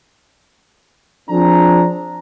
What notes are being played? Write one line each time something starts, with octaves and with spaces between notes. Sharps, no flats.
F3 C4 D4 G#4 A#5